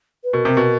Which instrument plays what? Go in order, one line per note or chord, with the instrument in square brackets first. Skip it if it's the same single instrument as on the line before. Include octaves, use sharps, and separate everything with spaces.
[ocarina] B4
[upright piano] B2 [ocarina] A#4
[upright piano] C3
B2